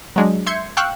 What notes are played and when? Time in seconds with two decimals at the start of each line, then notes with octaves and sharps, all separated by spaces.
0.16 F#3 G#3 D4
0.46 E5 C6 G6 G#6 C#7
0.77 F5 G5 C#6 E6 F#6